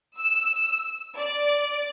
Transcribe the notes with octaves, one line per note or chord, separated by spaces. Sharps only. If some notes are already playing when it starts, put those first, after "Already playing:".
E6
D5